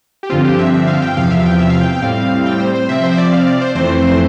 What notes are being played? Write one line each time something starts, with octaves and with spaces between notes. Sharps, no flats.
G4
G2 D3 F3 C4 F4
G4
E5
E5
F5
G5
E2 C3 F3 F5
E5
F5
G5
E5
F5
G5
G5
A2 G3 C4 F5
G5
C5
C5
C3 F3 C4 E5
C5
E5
D5
F5
D5
C5
F2 E3 A3 C4 C5